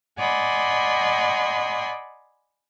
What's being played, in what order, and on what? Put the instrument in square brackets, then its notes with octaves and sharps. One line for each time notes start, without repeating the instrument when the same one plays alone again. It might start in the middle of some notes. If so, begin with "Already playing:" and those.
[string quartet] D5 D#5 F#5 G#5 B5 C6